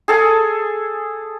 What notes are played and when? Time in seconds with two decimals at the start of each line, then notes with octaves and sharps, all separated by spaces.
0.08 G#4 A4 G#5